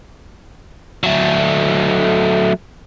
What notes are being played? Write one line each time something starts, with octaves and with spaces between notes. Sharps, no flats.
F#3 A3